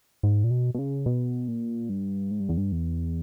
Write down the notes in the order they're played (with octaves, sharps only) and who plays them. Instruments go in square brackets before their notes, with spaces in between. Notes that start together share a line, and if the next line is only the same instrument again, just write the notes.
[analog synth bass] G#2
A#2
B2
B2
C#3
B2
A#2
G2
G#2
G2
E2
G2
E2